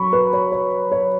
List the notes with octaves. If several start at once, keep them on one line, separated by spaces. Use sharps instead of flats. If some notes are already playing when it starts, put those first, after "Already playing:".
Already playing: F#3 B5 C#6
B4
C#5
C#5
C#5